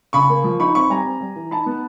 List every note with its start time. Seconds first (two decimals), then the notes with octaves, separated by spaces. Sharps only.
0.13 C#3 B5 C#6
0.29 A#3
0.44 F3
0.60 D#4 B5 C#6
0.75 C4 B5 C#6
0.90 G3 G#5 A#5
1.05 C4
1.21 G3
1.36 E3
1.51 D#4 A5 B5
1.66 B3